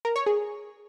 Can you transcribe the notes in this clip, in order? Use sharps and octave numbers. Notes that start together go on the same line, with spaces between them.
A#4
C#5
G#4